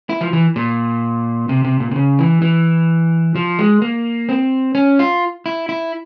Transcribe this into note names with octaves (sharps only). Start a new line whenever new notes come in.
E4
F3
E3
A#2
C3
C3
A#2
C3
C#3
E3
E3
F3
G#3
A#3
C4
C#4
F4
E4
E4